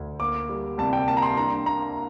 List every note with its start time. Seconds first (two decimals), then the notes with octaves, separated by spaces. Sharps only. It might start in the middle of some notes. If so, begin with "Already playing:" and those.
Already playing: D2
0.20 A#3 D6
0.49 G3
0.78 C2 A5
0.93 G5
1.08 A#3 A5
1.17 A#5
1.23 C6
1.37 D4 A#5
1.66 A#3 A#5